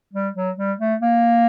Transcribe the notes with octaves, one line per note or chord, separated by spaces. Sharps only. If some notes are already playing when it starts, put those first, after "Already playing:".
G3
F#3
G3
A3
A#3